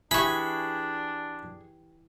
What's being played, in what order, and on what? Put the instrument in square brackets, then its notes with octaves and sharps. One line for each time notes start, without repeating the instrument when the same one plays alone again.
[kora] E3 G4 [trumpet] D4 [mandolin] G#4 C#6 [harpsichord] B5